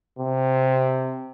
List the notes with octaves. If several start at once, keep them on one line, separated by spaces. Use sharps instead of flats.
C3